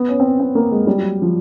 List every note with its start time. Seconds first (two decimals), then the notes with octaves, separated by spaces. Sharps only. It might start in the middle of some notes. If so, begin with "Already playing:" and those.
Already playing: B3
0.08 C#4
0.20 C4
0.25 C#4
0.40 C4
0.55 A#3
0.71 G#3
0.87 G3
0.98 F#3
1.22 F3